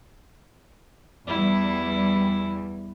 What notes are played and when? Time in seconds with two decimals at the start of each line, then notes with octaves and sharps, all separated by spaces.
1.27 E2 G3 E4